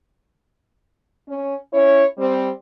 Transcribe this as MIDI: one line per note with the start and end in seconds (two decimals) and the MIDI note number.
1.28 1.55 61
1.73 2.05 61
1.73 2.05 64
1.73 2.05 73
2.18 2.50 55
2.18 2.50 60